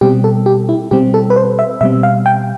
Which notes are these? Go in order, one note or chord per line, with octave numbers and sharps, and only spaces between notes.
B2 G3 C4 G4
A4
G4
E4
B2 G3 C4 G4
A4
B4
C5
E5
B2 G3 C4 E5
F5
G5